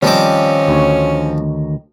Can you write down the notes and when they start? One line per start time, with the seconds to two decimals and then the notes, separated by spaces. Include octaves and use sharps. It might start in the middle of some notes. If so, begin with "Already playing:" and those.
0.03 D#3 F3 G3 C4 C#4 D#5 D6
0.68 D2 C#5